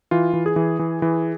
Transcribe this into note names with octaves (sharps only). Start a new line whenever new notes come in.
E3 F4
E3
G#4
E3
E3
E3